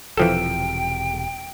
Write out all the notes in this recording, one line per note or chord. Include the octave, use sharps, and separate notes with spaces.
E1 C3 E3 F3 A4 G5